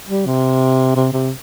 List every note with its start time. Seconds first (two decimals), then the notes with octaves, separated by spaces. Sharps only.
0.09 G3
0.26 C3
0.96 C3
1.13 C3